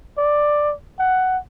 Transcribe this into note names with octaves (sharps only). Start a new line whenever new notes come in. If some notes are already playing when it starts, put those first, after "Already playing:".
D5
F#5